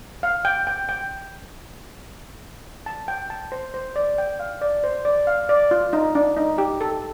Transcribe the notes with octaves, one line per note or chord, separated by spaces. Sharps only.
F5
G5
G5
G5
A5
G5
A5
C5
C5
D5
G5
F5
D5
C5
D5
F5
D5
F4
D#4
D4
D#4
G4
A4